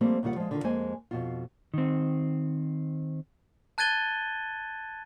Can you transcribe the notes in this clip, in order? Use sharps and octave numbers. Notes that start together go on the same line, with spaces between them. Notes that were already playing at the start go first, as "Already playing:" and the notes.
F3 G3 A3 A#3 C4
D#2 C#3 G3 F4 F#5
F3 G#3
D3 D#3 F4
F2 G#3 A#3 C5 D#5 G#5
F2 B2 F4
D#3 C4
A5 F#6 G#6 A6 D#7 G7